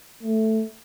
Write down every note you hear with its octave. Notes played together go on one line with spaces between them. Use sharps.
A3